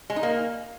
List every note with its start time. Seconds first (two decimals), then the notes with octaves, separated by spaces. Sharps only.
0.10 G#3
0.16 D#4
0.23 A#3